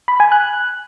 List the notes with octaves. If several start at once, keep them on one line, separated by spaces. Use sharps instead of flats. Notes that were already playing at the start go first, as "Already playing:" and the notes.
B5
G#5
F#6